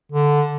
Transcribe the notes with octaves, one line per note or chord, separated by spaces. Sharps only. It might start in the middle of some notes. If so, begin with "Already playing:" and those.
D3